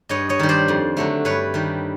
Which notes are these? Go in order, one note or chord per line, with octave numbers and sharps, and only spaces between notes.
G2 C#5 D#5
C#5 D#5
D#3 G3
C5 D5
F2
D3 F#3 A3
G2 B4 C#5
D#3 G3